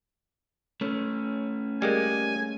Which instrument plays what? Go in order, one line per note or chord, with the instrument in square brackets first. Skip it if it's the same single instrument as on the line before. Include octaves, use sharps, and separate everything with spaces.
[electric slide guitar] A3 C#4
[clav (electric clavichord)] G3 G#3 A#3 [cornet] G#5